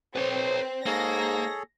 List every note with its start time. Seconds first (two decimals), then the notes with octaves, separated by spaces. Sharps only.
0.16 C4 B4 C#5
0.86 G#2 A#3 G#4 A4 C#5 A#6